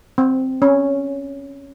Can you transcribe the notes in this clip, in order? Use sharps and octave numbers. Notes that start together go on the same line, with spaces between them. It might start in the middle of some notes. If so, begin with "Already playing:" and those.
C4
C#4